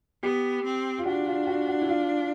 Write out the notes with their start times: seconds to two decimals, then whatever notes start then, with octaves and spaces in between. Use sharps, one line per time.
0.23 B3 G4
0.65 C4
0.98 F4
1.06 D4 F#4
1.27 F4
1.47 F#4
1.68 F#4
1.82 E4
1.89 F4